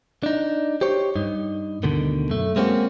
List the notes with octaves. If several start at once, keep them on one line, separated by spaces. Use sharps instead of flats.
D4 D#4
G4 C5 C#5
G2 D#4
D2 B2 D3 D#3
F#2 A3
G#3 A#3 C4 C#4 F#4